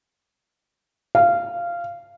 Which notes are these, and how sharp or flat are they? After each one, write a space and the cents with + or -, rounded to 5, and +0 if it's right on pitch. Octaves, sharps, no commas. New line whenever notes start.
F5 -15